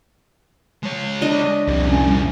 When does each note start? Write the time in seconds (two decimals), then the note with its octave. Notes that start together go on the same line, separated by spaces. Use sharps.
0.83 G#3 C#5
1.21 D4 D#5
1.67 C2 F2 A#2
1.87 C#4